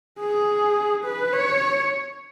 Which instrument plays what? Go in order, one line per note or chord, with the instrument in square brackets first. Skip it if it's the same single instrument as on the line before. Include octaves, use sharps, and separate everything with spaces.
[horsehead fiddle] G#4
B4
C#5